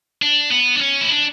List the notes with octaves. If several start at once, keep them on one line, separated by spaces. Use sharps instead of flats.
D4
B3
D4
C#4
E4
D4